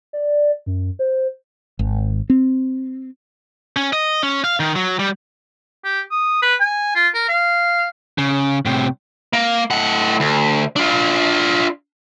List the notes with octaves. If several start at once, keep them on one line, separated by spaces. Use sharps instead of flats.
D5
F#2
C5
G#1
C4
C#4
D#5
C#4
F5
D#3
F#3
G3
G4
D#6
B4
G#5
F4
A#4
F5
C#3
A2 C3
A#3
A2 F#5
D2
D4 F4